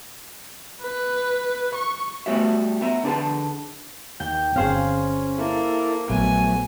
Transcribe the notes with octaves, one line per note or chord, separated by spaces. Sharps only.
B4
C#6
G3 A3 B3 F#4 C#5 E5
B3 E5 A#5
D3 D4 G#4 B4 A5
D#2 G5
G1 C4 C#4 G#4 C5 F5
A#3 E4 A4
A#1 F#3 A3 B3 G#5